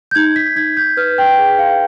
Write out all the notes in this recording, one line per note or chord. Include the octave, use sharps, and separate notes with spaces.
G6
D#4 G#6
B6
D#4 G#6
G6
B4 F6
G5
G#4
F5